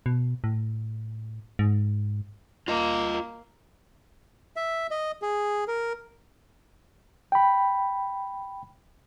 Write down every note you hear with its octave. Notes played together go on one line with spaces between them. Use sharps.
B2
A2
G#2
A#3 F4 D#5
E5
D#5
G#4
A#4
G5 B5